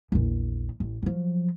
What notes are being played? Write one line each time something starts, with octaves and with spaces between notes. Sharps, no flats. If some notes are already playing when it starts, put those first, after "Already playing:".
A#1 E2
A1
F3 F#3